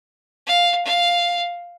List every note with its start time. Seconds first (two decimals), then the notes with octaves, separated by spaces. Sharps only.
0.46 F5
0.85 F5